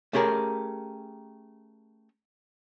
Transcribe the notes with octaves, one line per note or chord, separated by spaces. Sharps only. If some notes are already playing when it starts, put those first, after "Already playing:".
A3 C#4 G4 G#4 A#4